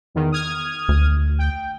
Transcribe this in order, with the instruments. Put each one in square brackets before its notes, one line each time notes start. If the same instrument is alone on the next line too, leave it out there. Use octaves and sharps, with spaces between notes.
[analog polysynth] E2 D#3
D#6 F6 G#6
[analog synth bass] D2
[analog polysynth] G5